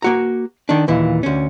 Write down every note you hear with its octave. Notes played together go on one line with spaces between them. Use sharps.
A#3 F#4 A#5
D#3 D4
D#2 A#2 E3
D2 C#4